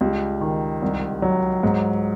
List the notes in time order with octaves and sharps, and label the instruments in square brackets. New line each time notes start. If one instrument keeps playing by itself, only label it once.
[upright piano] C#2 G3 G4
D#3
C2
F#3
G#2